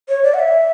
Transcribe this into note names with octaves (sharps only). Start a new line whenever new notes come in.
C#5
D5
F#5
E5